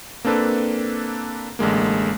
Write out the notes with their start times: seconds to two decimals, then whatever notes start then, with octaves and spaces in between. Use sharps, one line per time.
0.25 A#3 C4 D4 A4 B4
1.59 A1 D3 G#3 A#3